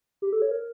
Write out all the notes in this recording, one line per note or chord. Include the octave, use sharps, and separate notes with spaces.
G4
A4
C#5
A#4